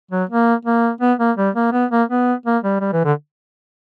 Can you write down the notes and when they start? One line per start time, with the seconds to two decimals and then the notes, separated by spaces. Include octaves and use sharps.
0.11 F#3
0.30 A#3
0.65 A#3
1.01 B3
1.19 A#3
1.37 G3
1.55 A#3
1.73 B3
1.91 A#3
2.09 B3
2.46 A#3
2.63 G3
2.81 G3
2.93 E3
3.05 D3